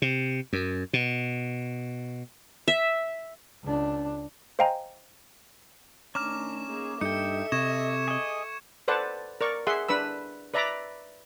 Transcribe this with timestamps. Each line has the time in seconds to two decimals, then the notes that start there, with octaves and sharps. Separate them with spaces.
0.02 C3
0.53 F#2
0.93 B2
2.68 E5
3.64 C#2 D4
4.59 C5 D#5 F5 G5 G#5 A#5
6.15 D#3 A3 C#4 D4 A#5 D6 F6 E7
6.69 A#3 D#4 G#4
7.01 G2 D#4 A4 E5 G5 C#7
7.52 C3 D#5 C#6 G#6 E7
8.08 G#4 D#5
8.88 A4 B4 C5 D5 F#5 A5
9.41 A#4 D5 C#6
9.67 G#4 E5 F#5 C6
9.88 D4 B4 B5 E6
10.54 B4 D5 E5 A#5 B5 D6